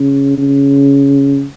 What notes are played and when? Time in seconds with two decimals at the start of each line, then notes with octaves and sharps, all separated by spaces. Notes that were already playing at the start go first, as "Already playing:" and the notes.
Already playing: C#3
0.38 C#3